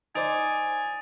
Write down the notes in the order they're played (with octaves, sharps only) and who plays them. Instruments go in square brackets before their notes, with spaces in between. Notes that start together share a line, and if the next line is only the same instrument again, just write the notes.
[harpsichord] D#4 C5 D5 [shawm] G#5 [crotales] D#6 A6 D7